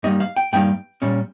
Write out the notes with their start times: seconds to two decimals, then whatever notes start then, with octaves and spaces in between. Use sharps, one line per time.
0.03 G2 G3 A#3 D#4 D#5
0.20 F5
0.37 G5
0.53 G2 G3 A#3 D#4 G5
1.02 A#2 G3 C#4